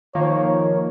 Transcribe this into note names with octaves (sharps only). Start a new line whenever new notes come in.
D#3 F3 A#3 C#5